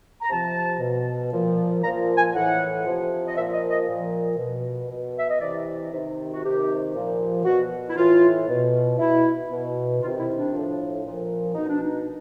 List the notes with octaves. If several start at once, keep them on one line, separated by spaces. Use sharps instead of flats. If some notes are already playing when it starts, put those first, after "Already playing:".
A#5
C3 F3 A5
B2
A#2 F3
A#2 F3 A#5
G#5
A2 E3 F#5
C3 F3
D#5
A#2 F3 E5
D#5
D#5
A#2 F3
B2
B2
E5
D#5
C3 E3 D5
C3 D#3
F#4
C3 D#3 G4
A#2 F3
B2 F#4
E4
A2 E3 F4
B2
B2 E4
B2
C3 D#3 F4
E4
D4
A2 F3
A#2 F3
B2 D#4
D4
D#4